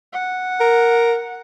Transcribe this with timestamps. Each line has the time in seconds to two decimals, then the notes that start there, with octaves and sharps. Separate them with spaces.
0.12 F#5
0.61 A#4